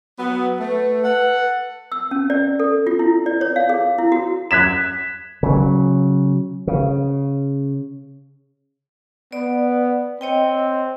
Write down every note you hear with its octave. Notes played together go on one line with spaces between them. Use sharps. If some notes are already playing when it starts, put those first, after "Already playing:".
F#3 B3
A3 B4
A4 F#5
E6
C#4
D5
A4
F4
E4
D5
C#5
F5
G#4
E4
F#4
F#6 G#6 B6 E7
C#3 F#3
C#3
B3 D5
C4 C#5 D#5 G5